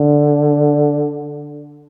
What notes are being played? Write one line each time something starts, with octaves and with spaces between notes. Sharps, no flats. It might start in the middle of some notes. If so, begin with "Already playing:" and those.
Already playing: D3